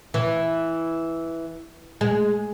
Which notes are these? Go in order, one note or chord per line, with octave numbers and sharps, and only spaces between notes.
E3
G#3